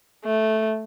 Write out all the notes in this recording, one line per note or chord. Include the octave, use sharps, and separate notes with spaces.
A3